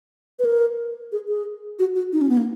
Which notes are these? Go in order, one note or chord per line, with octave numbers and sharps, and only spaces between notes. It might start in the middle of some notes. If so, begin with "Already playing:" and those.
B4
A#4
G#4
G#4
F#4
F#4
D#4
C#4
B3
A#3